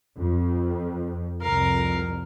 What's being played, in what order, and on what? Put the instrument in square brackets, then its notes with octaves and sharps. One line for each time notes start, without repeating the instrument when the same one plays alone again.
[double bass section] F2
[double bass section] C2 F2 [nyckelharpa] A#4 F5